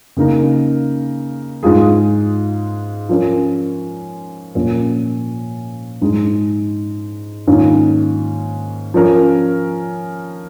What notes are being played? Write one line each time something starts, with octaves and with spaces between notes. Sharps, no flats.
C#3 A#3 D#4 A#4
G#2 G#3 F4 G#4
F3 C#4 A#4
A#2 F3 A#3 C#4
G#2 G#3 D#4 G#4
G#2 D#3 A#3 C#4 F4
F3 C#4 A#4